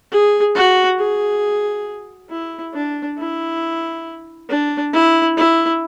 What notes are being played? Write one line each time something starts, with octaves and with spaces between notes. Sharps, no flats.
G#4
F#4
G#4
E4
D4
E4
D4
E4
E4